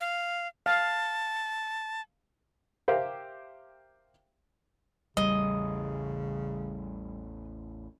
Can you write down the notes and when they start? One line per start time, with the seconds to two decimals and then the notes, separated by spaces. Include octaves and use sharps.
0.01 F5
0.66 F5 A5
2.88 G4 A#4 C5 E5 F5 G5
5.17 A1 E2 C#3 G3 D#5